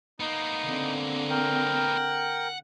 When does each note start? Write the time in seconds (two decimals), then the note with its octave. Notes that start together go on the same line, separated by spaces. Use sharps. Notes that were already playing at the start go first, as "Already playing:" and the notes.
0.20 A#3 B3 D#4
0.65 D3 C4
1.30 A#4 G5
1.97 F#5